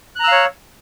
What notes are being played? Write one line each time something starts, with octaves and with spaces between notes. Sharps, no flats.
C#5 F5 A#5 E6 F#6